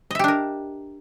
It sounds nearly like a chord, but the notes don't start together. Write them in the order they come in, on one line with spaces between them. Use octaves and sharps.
D#5 E5 G4 D4 A#4